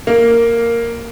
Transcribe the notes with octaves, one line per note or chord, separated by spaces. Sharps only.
A#3